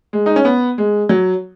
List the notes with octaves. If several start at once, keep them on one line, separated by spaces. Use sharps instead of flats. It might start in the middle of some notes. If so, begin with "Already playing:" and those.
G#3
D#4
C#4
B3
G#3
F#3